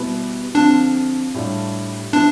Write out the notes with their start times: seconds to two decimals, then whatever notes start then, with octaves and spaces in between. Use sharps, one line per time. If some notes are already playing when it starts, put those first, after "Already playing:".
Already playing: B2 G3 B3 E4
0.54 D3 F3 C4 D4 F4
1.34 A2 G3 D4 F4
2.13 F3 B3 D4 E4